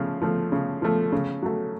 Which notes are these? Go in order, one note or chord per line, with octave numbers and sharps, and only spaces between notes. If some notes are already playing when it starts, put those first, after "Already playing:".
Already playing: C#3 F3 A3
F3 A3
C#3
F3 A3
C#3
F#3 A3